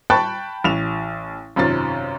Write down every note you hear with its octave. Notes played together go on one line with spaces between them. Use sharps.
G5 A5 B5 C#6 F#6 A6
A1 E7 F7
G#1 F#2 C3 F4 A6